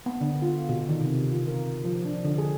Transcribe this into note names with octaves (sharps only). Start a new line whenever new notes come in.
B3
D3
F4
B2
D#3
C3
F4
A#4
F3
D4
D3
G#4